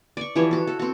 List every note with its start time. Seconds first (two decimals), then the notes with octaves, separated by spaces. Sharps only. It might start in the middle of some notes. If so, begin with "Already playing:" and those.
0.17 D5 C#6
0.36 E3 F3 G3 C#5
0.51 F#4 A4
0.67 A4
0.79 C4 F#4